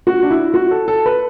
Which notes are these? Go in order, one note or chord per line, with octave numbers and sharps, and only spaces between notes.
F#4
D4
E4
F#4
A4
A4
B4